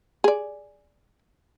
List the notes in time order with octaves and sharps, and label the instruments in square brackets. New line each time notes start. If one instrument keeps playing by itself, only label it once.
[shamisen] G#4 D5